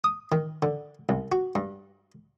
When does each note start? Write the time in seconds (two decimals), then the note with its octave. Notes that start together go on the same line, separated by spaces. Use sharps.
0.04 D#6
0.32 D#3
0.62 D3
1.09 C2
1.32 F#4
1.55 G2